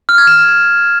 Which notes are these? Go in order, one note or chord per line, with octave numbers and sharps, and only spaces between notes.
F6
G#6
E7